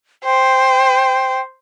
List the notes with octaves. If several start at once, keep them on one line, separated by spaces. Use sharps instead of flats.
C5 G5